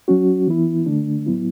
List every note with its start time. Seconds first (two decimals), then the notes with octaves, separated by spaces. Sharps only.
0.08 F#3 C#4 F#4
0.47 E3 B3 E4
0.86 D3 A3 D4
1.26 A2 F#3 B3 E4